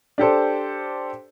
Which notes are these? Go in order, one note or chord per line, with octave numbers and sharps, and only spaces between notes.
D4 G4 A4 C5